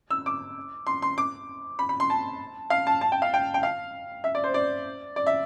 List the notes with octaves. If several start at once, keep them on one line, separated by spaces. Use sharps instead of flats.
E6
D6
C6
C6
D6
B5
B5
C6
A5
F5
A5
A5
G5
F5
G5
G5
F5
E5
D5
C5
D5
D5
E5